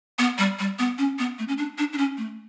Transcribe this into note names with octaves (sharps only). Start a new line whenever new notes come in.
B3
G3
G3
B3
C#4
B3
A3
C#4
D4
D4
D4
C#4
A3